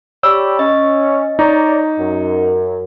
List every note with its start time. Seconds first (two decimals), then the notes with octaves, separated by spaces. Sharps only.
0.23 G4 C#5 D5 B5 E6
0.59 C#4 D#5
1.39 D#4 C#5 D5 A#5
1.98 F#2